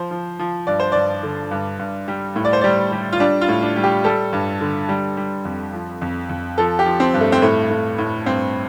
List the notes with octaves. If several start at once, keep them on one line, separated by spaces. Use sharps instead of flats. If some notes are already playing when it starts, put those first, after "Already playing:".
Already playing: F3 C5
F3
F3
G2 D5
C5
G2 D5
D3
G2
G2
G3
A2
D5
C5
G3 D5
G3
F4
G3 D4
F4
A2
D4
G3
G4
G3 A4
G2
D3
G3
G3
F2
F3
F2
F2
F3 A4
G4
F3
C4
G2
A3
C4
A2 A3
A2
A2
G2 C4